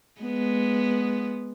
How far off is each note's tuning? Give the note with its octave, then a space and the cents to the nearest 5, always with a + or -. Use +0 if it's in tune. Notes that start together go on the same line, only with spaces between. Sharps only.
G#3 +10 B3 +0